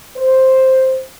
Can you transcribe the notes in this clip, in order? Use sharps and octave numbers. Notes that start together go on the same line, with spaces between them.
C5